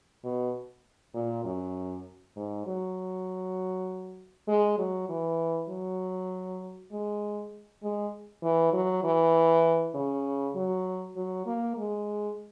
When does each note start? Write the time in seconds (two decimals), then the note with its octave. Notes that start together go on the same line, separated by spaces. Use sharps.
0.24 B2
1.14 A#2
1.44 F#2
2.36 G#2
2.67 F#3
4.48 G#3
4.78 F#3
5.09 E3
5.69 F#3
6.92 G#3
7.83 G#3
8.43 E3
8.73 F#3
9.04 E3
9.95 C#3
10.55 F#3
11.16 F#3
11.46 A#3
11.77 G#3